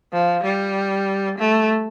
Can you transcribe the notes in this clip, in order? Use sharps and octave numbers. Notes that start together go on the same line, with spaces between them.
F3
G3
A3